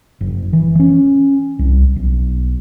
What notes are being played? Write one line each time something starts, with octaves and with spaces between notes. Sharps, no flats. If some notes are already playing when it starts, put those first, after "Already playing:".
F#1
E3
C#4
C2
B1